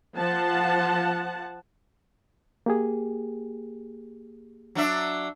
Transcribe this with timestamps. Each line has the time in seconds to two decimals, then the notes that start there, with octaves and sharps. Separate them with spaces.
0.16 F3 F#5 A5
2.66 A#3 G4 G#4
4.75 F#3 D4 E5